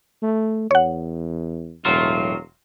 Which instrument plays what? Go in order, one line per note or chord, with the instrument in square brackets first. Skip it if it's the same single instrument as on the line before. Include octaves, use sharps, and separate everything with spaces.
[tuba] A3
[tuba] E2 [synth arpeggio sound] C#5 F#5
[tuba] E1 [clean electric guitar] A2 F#3 F4